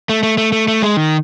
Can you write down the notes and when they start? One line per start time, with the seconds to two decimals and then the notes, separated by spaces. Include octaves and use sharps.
0.09 A3
0.23 A3
0.38 A3
0.52 A3
0.68 A3
0.82 G#3
0.97 D#3